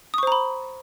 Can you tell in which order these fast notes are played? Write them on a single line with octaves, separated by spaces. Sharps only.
D#6 C#6 C5 A#5 B5